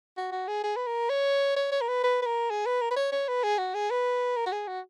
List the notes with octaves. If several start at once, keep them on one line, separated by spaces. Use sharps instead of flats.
F#4
F#4
G#4
G#4
B4
A#4
C#5
C#5
C#5
A#4
B4
B4
B4
A#4
G#4
B4
A#4
B4
C#5
C#5
B4
G#4
F#4
G#4
B4
A#4
F#4
G#4
F#4